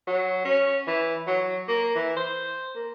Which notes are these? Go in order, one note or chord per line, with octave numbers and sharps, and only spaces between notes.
F#3
C#4
E3
F#3
A#3
E3
C5
A#3